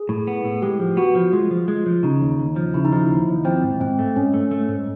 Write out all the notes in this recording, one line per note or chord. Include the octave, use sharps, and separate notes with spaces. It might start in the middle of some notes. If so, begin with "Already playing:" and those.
Already playing: G#4
A2
B3
A2
G#3 G4
F3
B3 F#4
F3
G#3 F4
F3
G#3
F3
C#3 D#4
D#2
D#2
F3
C#3 E4
D#4
F3 E4
D#2
D#2
F3 C4
G#2
G#2 C4
A3
G#2 C#4
A3
A3
G#2